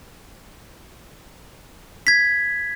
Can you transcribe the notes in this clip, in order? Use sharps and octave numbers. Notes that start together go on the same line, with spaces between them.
G#6 B6